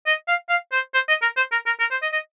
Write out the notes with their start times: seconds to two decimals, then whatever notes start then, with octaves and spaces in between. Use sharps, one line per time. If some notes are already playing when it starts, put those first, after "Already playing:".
0.07 D#5
0.28 F5
0.49 F5
0.72 C5
0.94 C5
1.08 D#5
1.22 A#4
1.37 C5
1.52 A#4
1.66 A#4
1.80 A#4
1.91 C5
2.02 D#5
2.13 D#5